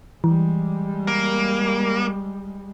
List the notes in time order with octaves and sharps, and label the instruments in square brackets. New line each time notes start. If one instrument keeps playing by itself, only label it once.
[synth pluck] E3 [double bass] G3 G#3
[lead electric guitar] A#3